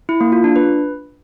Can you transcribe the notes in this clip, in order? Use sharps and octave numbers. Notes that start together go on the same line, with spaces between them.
E4
A#3
F4
D4
B4